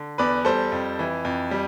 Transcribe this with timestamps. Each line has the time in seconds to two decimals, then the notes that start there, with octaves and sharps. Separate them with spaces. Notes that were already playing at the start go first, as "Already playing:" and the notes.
Already playing: D3
0.18 E2 B4 D5
0.45 G3 A4 C5
0.72 F2
0.99 E3
1.25 F2
1.51 G3